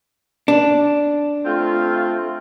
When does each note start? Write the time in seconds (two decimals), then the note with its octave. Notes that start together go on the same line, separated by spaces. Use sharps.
0.48 D4
1.45 A3 C4 F4